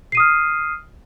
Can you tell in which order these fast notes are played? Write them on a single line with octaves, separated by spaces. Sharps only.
C7 D#7 D#6 F6